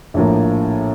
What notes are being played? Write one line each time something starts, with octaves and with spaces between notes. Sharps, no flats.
A#1 A2 F3 A#3